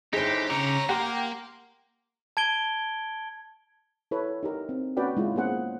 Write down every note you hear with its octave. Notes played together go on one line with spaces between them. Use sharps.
G1 D#4 E4 G4 G#4 C5 G5
C#3 C#5 G5 A#5 D6 C#7 F7
A#3 G4 F#5 C6 F6
A5 G#6 D7 G7
E4 A4 B4 C#5
D#4 G4 A#4 D#5
C4
A#3 C#4 F#4 B4 D5 G5
G#3 E4 F4 B4
A#3 B3 C#4 G#4 C5 F#5